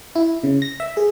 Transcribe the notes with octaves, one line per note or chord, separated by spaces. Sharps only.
E4
C#3
A#6
E5
G#4